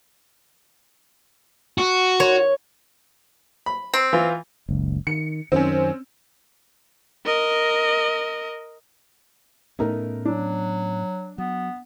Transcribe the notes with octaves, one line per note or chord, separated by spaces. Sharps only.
F#4
C#5
B5
C4
E3 F4
F#1 C#2
D#3 C#7
F#2 D#3 C4 C#4
A#4 D#5
A2 A3 B3 C#4 D#4 A#4
F#3 D4
F#3 B3